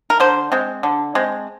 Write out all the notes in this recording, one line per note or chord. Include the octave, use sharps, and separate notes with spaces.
A#4
D3 C5
G#3 C4
D3
G#3 C4